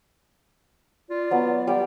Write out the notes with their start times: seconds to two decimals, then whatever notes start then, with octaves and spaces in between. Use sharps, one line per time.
1.10 F4 D5
1.31 F#3 B3
1.67 G3 D5 G5